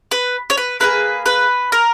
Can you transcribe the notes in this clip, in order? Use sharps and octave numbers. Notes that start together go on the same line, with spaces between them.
B4
C#5
B4
A#3 E4 G#4 B4
B4
A#4